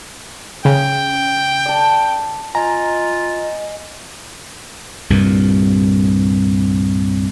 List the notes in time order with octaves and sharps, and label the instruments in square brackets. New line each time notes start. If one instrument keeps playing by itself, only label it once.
[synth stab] C#3 [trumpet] G5
[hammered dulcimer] D5 A5
[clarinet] F4 [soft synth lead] D#5 [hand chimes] G#5 [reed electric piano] A#5
[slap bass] C2 G2 A#2